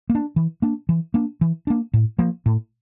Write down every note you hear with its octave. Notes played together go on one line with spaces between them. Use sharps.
A#3
D4
E3
A#3 D4
E3
A#3 D4
E3
A#3 D4
A2
F3 A#3
A2